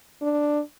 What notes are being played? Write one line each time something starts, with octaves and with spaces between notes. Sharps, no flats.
D4